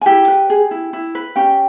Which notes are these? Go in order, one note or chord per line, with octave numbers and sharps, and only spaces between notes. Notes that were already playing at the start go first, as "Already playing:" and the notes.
G#5
E4 G4 G5
B4
G#4
E4
E4
B4
C#4 G4 G5